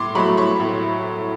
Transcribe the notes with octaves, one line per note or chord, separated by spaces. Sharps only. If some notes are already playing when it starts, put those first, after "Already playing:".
Already playing: A2 C6 D6
F#3 A3 B5 C#6
B5 C#6
A2